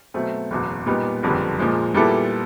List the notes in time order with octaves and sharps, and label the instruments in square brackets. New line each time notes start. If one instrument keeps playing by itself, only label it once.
[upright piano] B2 F#3 A3 C4
F#1 E2 B2
A#2 G3 B3 D#4
F#1 F2 D3 G3 B3
A#2 F3 G#3
A#2 G3 B3 E4 A4